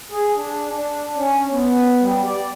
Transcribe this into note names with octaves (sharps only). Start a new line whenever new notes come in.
G#4
D4
D4
C#4
B3
G3
D5